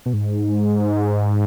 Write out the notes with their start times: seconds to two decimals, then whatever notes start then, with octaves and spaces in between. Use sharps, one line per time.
0.06 B2
0.13 G#2